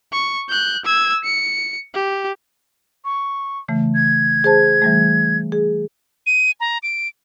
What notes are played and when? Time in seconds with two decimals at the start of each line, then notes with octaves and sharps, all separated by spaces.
0.13 C#6
0.49 F#6 G6
0.86 E6 G#6
1.24 C#7
1.95 G4
3.05 C#6
3.68 C#3 E3 A3
3.95 G#6
4.44 G#4 C5 A5
4.82 E3 G3 A3
5.52 G#4
6.27 D#7
6.60 A#5
6.83 D7